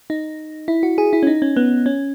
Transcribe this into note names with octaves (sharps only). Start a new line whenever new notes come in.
D#4
E4
F#4
G#4
E4
C#4
D#4
C#4
B3
C#4